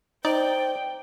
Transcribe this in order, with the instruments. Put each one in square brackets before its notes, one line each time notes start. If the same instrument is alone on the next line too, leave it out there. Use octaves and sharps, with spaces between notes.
[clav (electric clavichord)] D#4 [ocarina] C5 [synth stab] D5 [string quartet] G5